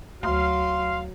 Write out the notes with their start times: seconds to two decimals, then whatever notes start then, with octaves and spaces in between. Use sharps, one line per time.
0.23 D2 F#3 F5 C6